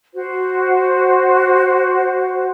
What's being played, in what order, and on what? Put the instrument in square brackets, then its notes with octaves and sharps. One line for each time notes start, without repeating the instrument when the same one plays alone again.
[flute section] F#4 C5